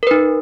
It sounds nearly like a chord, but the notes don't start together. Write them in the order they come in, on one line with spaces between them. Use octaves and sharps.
A#4 B4 D#4